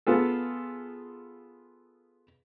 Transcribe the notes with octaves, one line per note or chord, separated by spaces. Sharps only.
B3 F4 G#4 A4